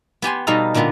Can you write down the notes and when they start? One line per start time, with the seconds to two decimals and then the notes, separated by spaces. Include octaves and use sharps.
0.22 B3 G4 G#5 C6
0.47 B2 G3 D#4 A4 F5
0.74 A#2 D3 A#3 B3 F4